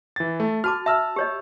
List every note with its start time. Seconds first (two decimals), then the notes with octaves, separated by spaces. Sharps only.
0.16 E3 A6
0.40 A3
0.64 F#4 A5 D6 F6
0.86 E5 A5 E6 F6
1.16 G4 C#5 D#5